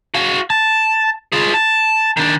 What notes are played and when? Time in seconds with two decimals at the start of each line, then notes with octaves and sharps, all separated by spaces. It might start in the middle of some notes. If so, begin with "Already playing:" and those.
0.14 F#4 F5
0.50 A5
1.32 F4 G#4
1.54 A5
2.17 D#3 D4